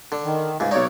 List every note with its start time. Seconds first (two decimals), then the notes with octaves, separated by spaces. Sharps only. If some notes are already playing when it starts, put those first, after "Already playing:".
0.12 D3
0.24 D#3
0.60 C#2 G#2
0.71 B1 D#4 C#5 D5